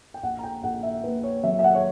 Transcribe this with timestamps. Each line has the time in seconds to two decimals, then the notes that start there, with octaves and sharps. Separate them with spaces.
0.14 G5
0.23 A#1 F#5
0.39 A#5
0.43 G5
0.63 A#1 F#5
0.83 E5
1.03 A#2 B4
1.24 C#5
1.43 F#3 E5
1.59 E5
1.64 F#5
1.74 C#5